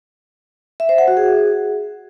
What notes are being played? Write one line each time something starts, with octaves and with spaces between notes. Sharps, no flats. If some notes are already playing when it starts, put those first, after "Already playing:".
E5
C5
F#5
F#4
G#4